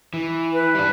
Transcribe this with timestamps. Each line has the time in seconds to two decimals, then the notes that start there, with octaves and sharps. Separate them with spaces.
0.14 E3
0.53 B4
0.75 G3 D4